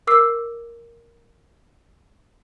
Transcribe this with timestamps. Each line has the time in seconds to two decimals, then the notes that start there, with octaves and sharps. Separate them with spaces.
0.07 A#4 D6 E6 C7